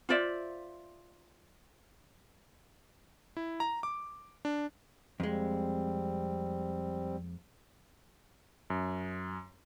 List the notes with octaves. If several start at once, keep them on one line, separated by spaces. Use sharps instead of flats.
F4 C5 D5 E5
E4
A#5
D6
D4
F2 G3 G#3 C4
F#2